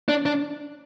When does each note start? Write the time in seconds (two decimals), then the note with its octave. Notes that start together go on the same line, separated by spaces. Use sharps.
0.09 D4
0.26 D4